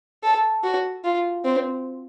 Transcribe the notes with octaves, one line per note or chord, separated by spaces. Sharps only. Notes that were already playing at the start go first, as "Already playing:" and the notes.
A4
F#4
F4
C4